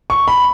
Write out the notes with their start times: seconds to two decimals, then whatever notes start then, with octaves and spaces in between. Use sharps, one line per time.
0.10 C#6
0.28 B5